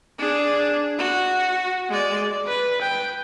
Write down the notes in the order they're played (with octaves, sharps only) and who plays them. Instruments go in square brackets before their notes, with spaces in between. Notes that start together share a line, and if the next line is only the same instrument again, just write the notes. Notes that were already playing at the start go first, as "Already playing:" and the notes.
[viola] D4 G#4
F#4
G#3 D5
[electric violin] B4
G5